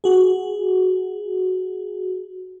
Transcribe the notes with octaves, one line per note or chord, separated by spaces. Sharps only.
F#4 G#4